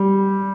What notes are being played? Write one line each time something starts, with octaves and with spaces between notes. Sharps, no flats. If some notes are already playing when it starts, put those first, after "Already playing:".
Already playing: G3